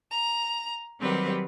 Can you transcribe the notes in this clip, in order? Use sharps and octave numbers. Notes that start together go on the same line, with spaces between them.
A#5
D#3 F#3 G3 C4 G4 B4